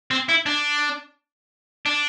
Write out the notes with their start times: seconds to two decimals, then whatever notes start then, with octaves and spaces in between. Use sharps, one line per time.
0.11 C4
0.29 E4
0.46 D4
1.86 D4